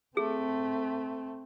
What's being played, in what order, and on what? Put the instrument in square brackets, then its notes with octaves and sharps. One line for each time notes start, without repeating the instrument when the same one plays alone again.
[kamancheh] A3 [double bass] C4 [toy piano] G#4